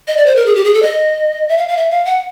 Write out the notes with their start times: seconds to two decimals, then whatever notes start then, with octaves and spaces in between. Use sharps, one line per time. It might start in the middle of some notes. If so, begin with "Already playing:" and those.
0.08 D#5
0.17 D5
0.26 C5
0.36 A#4
0.46 G#4
0.55 G4
0.64 G#4
0.74 A4
0.82 D#5
1.49 E5
1.58 F5
1.68 F5
1.77 E5
1.91 F5
2.05 F#5